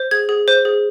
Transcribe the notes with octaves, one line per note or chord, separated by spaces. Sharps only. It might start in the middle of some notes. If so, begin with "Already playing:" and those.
Already playing: C5
G#4 G#6
G#4
C5
G#4